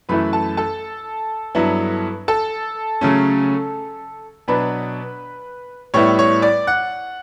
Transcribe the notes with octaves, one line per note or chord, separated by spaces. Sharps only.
F#2 E3 A3 E4 B4 B5
A4 A5
A4 A5
G2 F#3 B3 E4
A4 A5
C#3 F#3 A3 C#4
B2 F#3 B3 D4 B4 B5
A2 G3 B3 E4 C#5 C#6
C#5 C#6
D5 D6
F#5 F#6